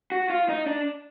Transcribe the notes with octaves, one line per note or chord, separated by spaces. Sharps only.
F#4
F4
D#4
D4